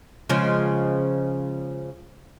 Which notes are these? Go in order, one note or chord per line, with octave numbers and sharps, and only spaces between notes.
C#3 F3 G#3